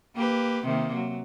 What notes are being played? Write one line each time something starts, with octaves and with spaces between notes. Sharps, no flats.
A#3 G4 B4
C3 D#3 A#3
F#3